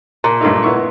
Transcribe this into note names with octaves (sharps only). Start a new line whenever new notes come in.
A#2
G2 A3 D#4
B3 E4 C#6